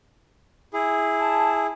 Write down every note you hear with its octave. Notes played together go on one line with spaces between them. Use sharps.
E4 G#4
A5